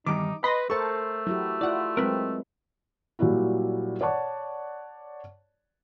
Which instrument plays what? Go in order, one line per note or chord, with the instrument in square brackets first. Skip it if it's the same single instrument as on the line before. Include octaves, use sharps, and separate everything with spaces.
[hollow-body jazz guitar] E2 G2 D#3 [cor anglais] D#4 [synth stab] D6
[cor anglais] B4 [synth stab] D#5 C6 A#6 [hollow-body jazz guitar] B5
[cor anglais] A3 [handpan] A4 A#4 C5 [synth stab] A5 C#6
[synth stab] F#3 [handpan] E4 F#4 G4
[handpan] E4 F4 [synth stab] D5 F#5
[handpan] F#3 G#3 C4 [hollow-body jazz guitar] A#4 B4
[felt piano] A#2 F#3 G3 E4 F#4
C#5 D5 F#5 A5 C#6